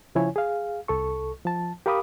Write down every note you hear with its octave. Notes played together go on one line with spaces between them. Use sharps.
C#3 F3 E4 C#5 G#5
G#4 F5
C2 A4 C#6
F3 A5
G4 A#4 F5 B5 D6 D#6